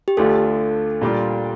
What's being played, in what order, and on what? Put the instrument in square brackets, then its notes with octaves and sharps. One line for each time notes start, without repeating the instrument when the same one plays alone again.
[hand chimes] G4
[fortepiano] D2 D3 A3 D4 F4 [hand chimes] A4
[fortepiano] A#2 G3 D4 F4